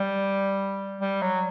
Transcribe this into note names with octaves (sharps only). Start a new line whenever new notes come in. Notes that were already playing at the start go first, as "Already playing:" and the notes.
Already playing: G3
G3
F#3